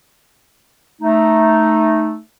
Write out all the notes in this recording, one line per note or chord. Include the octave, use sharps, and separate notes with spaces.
A3 D#4